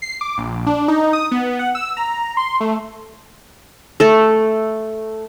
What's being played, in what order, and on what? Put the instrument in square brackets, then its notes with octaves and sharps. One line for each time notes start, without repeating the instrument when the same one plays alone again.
[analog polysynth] C7
D6
A#1
D4
D#4
D#6
B3
F#5
E6
A#5
C6
A3
[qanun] A3 A4